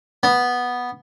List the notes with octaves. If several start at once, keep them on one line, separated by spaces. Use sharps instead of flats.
B3